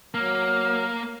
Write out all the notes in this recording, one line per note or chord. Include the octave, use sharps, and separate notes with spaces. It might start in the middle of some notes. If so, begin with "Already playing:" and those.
F#3 A#3 F6